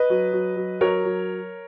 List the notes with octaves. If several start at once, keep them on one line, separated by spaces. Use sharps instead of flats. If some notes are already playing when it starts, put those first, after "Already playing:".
Already playing: B4 D#5
F#3
F#3
F#3
F#3 A#4 C#5
F#3